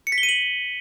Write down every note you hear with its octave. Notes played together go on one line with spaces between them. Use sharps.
C#7
B6
G7
D#7
F#7